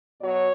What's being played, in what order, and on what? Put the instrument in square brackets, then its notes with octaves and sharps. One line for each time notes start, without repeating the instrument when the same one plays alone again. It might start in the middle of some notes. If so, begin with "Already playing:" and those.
[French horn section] B2 F#3 C#5